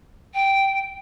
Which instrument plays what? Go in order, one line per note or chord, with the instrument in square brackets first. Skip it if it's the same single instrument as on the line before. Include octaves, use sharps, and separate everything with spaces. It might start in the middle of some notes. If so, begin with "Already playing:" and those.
[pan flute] G5